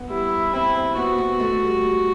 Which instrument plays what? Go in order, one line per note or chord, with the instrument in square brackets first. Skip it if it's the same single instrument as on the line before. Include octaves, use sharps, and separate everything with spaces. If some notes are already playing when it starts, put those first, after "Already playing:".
Already playing: [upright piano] B3
[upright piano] G3 [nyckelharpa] E4
[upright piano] C4 [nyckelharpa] E4
[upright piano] C4
[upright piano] B3 [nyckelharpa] F#4
[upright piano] B3
A3
G3
G3